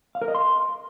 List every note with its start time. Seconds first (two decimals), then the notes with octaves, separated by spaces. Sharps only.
0.15 F5
0.22 A#4
0.28 D#5
0.35 C6